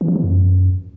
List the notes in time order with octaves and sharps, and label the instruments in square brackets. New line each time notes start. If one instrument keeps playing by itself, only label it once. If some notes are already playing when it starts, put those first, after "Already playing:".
[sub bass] E3
F3
E3
F#2